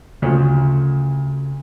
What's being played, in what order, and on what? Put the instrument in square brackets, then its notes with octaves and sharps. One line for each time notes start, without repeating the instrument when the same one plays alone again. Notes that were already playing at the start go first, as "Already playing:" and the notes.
[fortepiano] D2 F3 [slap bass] C#3